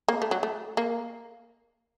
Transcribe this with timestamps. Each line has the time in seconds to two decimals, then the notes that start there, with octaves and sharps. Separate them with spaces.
0.08 A#3
0.22 A3
0.31 F#3
0.43 A3
0.77 A#3